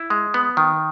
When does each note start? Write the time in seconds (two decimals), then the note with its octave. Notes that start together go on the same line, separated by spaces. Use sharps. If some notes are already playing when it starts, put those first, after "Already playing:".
Already playing: E4
0.10 G#3
0.34 B3
0.57 D#3